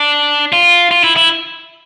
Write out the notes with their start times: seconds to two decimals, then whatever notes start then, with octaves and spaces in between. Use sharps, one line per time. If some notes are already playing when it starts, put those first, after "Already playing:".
Already playing: D4
0.53 F4
0.91 F4
1.04 E4
1.17 E4